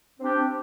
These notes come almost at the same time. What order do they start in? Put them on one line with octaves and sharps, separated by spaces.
C4 D4 G4